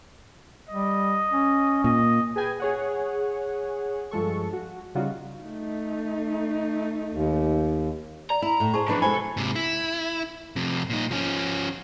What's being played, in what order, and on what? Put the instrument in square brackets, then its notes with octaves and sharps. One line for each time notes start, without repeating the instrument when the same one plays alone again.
[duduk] G3 [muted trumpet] D#5
[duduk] C#4
[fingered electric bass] A#2 [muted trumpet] D#5
[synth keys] G#4 B4 G5 G#5
G#4 C#5 F#5
G2 F3 G#3 A4 C#6
F#4
C#3 G3 D#4 F4 F#4
[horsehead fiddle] A3 D#4
[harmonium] D#2
[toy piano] D5 [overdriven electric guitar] A#5
[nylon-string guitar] E4
A2
[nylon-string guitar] G#4 C5 [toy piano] A5 C#6
[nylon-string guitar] E3 D4 B4 [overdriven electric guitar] F3 B3 [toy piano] A5
[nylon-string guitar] B2 G#3 G#5 [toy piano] F#4 C5 B5 [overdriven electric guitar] A4
[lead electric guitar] G#2 C3
E4
F2 C3
A#2 D#4
F3 C#4